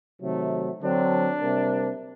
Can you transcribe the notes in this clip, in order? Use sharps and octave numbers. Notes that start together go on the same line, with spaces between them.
C3 D#3 F#3 A3
D3 F#3 C4 D4
C3 G3 A#3